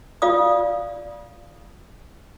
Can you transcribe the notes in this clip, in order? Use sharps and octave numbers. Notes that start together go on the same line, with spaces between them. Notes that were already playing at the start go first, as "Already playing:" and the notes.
F4 D5 F5 D#6